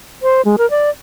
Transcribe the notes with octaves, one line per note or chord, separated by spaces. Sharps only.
C5
G#3
A#4
D5